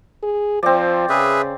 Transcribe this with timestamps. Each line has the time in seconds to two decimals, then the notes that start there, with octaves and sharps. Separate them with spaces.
0.23 G#4
0.63 F3 C4 D5
1.09 C#3 G#4 B4 E5